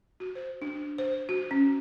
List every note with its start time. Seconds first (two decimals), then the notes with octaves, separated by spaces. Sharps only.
0.20 F#4
0.35 C5
0.62 D4
0.98 C5
1.29 F#4
1.51 C#4